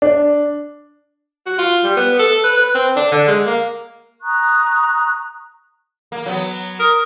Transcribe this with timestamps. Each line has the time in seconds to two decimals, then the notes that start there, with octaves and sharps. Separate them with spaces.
0.02 D4
1.46 F#4
1.58 F4
1.84 G3
1.97 B3
2.19 A4
2.44 B4
2.57 B4
2.75 C4
2.96 D4
3.12 D3
3.28 G#3
3.47 A#3
4.21 A#5 C#6 D#6 F#6
6.12 A#3
6.26 F#3 B3
6.80 A#4 D#6